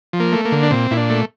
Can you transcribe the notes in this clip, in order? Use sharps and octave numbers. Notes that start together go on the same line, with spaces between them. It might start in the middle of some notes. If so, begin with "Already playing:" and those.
F3
A#3
A3
A#3
D3
D4
A#2 C4
A#2 E4
D4
A3